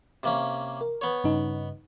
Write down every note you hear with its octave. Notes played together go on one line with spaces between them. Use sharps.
C3 A#3 C#4
A#4
B3 C#5
G2 C#3 D#4